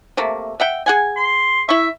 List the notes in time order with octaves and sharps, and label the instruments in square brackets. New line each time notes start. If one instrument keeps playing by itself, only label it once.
[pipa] C3 A3 A#3
E5 F#5 G5
G#4 F#5 G#5
[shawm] C6
[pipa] E4 C#6 [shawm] E5